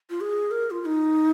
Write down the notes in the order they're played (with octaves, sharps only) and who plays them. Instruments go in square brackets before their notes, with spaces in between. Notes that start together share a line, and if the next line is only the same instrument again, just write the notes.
[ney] F4
G#4
A#4
F4
F4
D#4